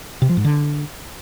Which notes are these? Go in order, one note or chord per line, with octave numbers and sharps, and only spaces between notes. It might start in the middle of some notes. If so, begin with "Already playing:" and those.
C3
F3
G#2
D3